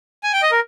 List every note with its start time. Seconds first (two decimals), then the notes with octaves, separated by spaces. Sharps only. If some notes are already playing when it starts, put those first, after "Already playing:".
0.24 G#5
0.33 G5
0.42 D#5
0.52 A#4